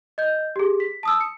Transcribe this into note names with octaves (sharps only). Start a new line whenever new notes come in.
D#5 G6
G4 G#4
B6
A5 D#6 E6
C#7